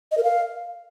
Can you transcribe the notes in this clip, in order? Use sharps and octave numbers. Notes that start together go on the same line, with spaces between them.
D#5
A#4
F5